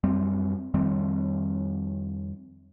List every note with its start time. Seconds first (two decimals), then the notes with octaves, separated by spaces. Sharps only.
0.04 F#2 G3 C4
0.74 F2 D#3 G3 C4